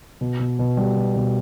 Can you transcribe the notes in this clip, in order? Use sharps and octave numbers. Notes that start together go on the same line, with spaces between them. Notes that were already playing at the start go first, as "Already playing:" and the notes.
B2
B2
B2
G3
B2
B2